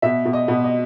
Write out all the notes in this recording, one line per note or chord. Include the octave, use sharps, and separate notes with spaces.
B2 E5
B2
D#5
B2
D#5